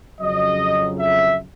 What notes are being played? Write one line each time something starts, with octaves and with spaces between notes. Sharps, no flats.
F2 C#3 F#3 D#5
E5